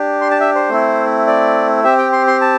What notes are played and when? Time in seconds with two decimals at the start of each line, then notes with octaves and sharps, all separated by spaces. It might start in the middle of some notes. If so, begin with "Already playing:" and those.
Already playing: D4 G4
0.21 C6
0.31 A5
0.40 E5
0.55 C5
0.69 A3 C4 E4
1.27 D5
1.84 C4 G4 E5
1.98 G5
2.12 C6
2.27 C6
2.41 A5